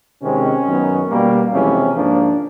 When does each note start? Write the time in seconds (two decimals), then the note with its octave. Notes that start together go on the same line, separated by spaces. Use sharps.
0.22 C3 D#3 G#3 C4 C#4
0.66 F#2 D#3 F#3 B3
1.10 B2 G3 A#3
1.53 F2 C3 E3 G#3 C#4
1.96 G#2 F3 A#3 D4